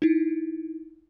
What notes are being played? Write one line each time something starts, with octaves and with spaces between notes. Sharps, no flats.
D#4 E4